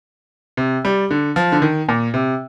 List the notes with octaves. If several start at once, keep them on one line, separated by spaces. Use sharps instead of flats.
C3
G3
D3
F3
D3
D#3
A#2
C3